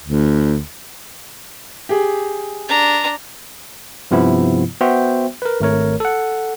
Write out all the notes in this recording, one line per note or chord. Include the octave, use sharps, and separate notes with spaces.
D2
G4 G#4
D4 A#5
G2 C3 F3 B3 E4
B3 F#4 C5 E5 G5
A#4 B4
G#1 A3 A#4 C#5
A4 F#5